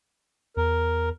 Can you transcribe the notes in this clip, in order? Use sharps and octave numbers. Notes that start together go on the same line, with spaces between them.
E2 A#4